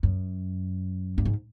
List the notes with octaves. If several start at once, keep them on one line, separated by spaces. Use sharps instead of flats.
F#2
G2
G#2